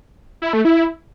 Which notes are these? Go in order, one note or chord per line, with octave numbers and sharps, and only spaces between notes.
E4
A3
E4